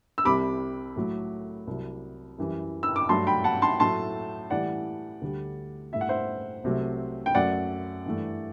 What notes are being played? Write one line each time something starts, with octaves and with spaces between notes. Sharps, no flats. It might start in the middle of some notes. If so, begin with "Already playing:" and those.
E6
C2 C3 G3 B5 D6
A2 F#3 A3
C2 C3 F#3
F#2 E3 G3
E6
D6
G2 F#3 A3 A5 C6
G5 B5
F#5 A5
A5 C6
A2 F#3 A3 A5 C6
A2 E3 G3 D5 F#5
D2 D3 G3
A2 G3 E5
F#5
C5 E5
C2 C3 F#3 A3
G5
F#2 F#3 A3 D5 F#5
G2 E3 A3